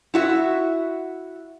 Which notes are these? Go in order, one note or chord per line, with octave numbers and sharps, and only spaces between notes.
E4 F#4 E5